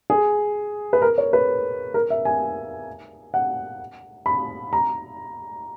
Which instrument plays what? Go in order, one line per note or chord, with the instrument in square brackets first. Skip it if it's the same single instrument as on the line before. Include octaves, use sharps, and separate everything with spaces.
[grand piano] G#4
B4
A#4
C#5
B4
A#4
E5
G#5
F#5
B5
A#5